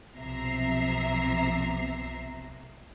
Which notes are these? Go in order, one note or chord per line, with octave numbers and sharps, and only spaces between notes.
B1 C3 F3 E5 A#5 C7